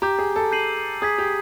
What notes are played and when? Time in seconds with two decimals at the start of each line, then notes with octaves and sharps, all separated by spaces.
0.02 G4 A#5 D6 G6
0.19 G#4
0.36 A4
0.52 G6 C7 D#7 F#7
1.02 G#4 D#6 G#6 B6
1.18 G4